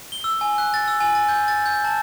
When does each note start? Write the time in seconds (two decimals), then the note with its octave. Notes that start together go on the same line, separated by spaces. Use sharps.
0.12 G7
0.24 E6
0.41 G#5
0.58 F#6
0.74 A6
0.88 E6
1.00 G#5
1.15 A6
1.29 G6
1.48 A6
1.66 G6
1.84 A5